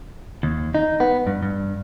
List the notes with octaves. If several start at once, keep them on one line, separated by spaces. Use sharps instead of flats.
D#2
D#4
B3
G2
G2